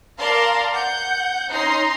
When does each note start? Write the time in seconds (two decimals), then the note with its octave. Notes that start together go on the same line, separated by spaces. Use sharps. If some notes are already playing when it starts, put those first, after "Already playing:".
0.19 A#4 D5 F5 A5 A#5 C6
0.72 F#5 G6
1.51 C#4 D#4 A#5 C6